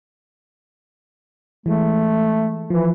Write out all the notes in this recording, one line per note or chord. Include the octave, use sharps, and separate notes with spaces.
E3 G#3 A3
E3 F3